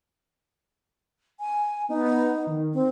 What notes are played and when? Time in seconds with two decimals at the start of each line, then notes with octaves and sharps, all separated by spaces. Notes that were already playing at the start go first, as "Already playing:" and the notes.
1.40 G#5
1.89 B3 D#4
2.47 D#3
2.73 C4